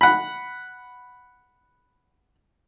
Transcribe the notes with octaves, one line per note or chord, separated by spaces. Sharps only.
F#5 B5